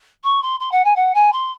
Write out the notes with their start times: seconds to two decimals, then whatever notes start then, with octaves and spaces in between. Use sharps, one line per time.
0.23 C#6
0.42 C6
0.60 C6
0.71 F#5
0.84 G#5
0.96 F#5
1.14 G#5
1.32 C6